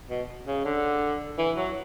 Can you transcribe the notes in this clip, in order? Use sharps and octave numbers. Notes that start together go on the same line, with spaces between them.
B2
C#3
D3
E3
F#3